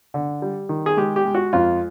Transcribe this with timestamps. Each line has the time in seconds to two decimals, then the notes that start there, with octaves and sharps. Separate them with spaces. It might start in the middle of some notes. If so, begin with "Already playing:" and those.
0.14 D3
0.42 G3
0.69 D#3
0.86 G#4
0.97 G#3 G4
1.16 G4
1.25 G#3
1.35 F#4
1.53 F2 F4